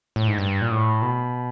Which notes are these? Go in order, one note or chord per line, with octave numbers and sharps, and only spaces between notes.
A2
G#2
G2
A#2
A2
B2